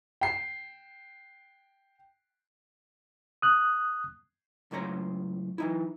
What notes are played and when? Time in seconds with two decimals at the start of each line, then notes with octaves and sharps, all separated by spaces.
0.21 G5 C7
3.42 D#6 F#6
4.71 C#2 F#2 A2 C5 C#5 A#5
5.58 E3 D#4 E4